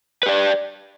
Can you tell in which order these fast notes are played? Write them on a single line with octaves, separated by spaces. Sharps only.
B4 G4 D5